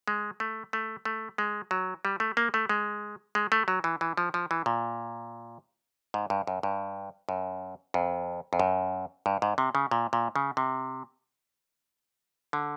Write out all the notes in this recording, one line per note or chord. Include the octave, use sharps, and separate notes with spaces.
G#3
A3
A3
A3
G#3
F#3
G3
A3
A#3
A3
G#3
G#3
A3
F#3
E3
E3
F3
F3
E3
A#2
G#2
G2
F#2
G2
F#2
F2
F2
F#2
G2
G#2
C3
C#3
A#2
A#2
C#3
C3
D3